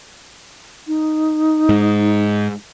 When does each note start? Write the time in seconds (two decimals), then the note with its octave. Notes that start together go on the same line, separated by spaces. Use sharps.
0.87 D#4
1.69 G#2